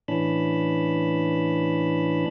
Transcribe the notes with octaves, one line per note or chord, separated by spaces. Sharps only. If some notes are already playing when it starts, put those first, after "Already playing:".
A2 E3 C#4 D4 A5 B5